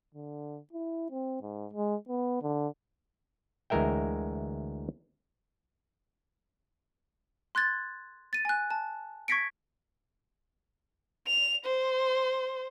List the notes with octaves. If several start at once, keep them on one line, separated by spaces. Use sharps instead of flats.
D3
E4
C4
G#2
G#3
B3
D3
D2 E3 G#3 A#4 E5 G5
C6 F#6 G#6 A6
A6 D#7
G#5 F#6
A5
C#6 G#6 A#6 B6 C#7 D7
F7
C5